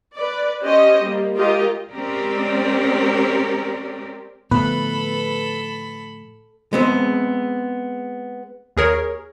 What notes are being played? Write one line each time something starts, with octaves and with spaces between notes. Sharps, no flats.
B4 D5
C#4 G4 C5 D#5
G3 A#3
G#3 F4 G4 A#4 D#5
G#3 C4 C#4 G4 A#4 D5
A2 D3 F3 B3 A4 B4 B5
G#3 B3 C4
D#2 G#4 A#4 C#5